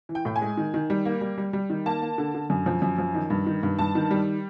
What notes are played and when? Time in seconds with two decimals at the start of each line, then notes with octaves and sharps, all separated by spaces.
0.09 E3
0.15 G5
0.25 A2 G5
0.36 G#5
0.41 G#3
0.57 D#3
0.74 D#3
0.90 G3
1.05 A#3
1.21 G3
1.38 G3
1.53 G3
1.70 D#3
1.86 A#3 A5
2.02 A#3
2.18 D3
2.34 D3
2.50 F#2
2.66 F3
2.82 F#2
2.98 F3
3.15 D#3
3.30 G2
3.47 D#3
3.63 G2
3.79 G2 A5
3.95 D#3
4.11 G3